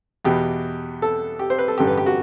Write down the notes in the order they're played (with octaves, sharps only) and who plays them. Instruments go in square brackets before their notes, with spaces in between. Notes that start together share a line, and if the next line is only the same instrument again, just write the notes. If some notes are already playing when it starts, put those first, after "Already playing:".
[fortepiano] E2 B2 G4
A4
G4
C5
B4
A4
A1 G2 D3 G4
B4
G4
F#4